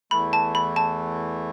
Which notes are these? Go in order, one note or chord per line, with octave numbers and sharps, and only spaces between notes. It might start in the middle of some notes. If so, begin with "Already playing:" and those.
E2 E3 A3 B5
A5
B5
A5